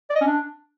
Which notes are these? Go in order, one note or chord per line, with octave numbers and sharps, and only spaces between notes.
D5
D#5
C#4
D4